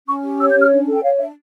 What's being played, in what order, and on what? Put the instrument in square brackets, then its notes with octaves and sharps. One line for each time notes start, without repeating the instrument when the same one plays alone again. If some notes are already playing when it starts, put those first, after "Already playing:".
[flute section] C#4 C#6
G4
C#5 E6
G6
C#4
F6
D4
A4
G5
C#5 F5
D4 E5